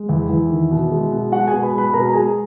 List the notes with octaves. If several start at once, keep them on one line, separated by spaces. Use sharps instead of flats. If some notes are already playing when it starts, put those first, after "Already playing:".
Already playing: G#3
E2 E4 E5
E2
D#3
B2
G#3
B2
G#3 F#4 F#5
G#4 G#5
B2
B4 B5
G#3
B4 B5
B2 A#4 A#5
A#5
G#3 G#4 G#5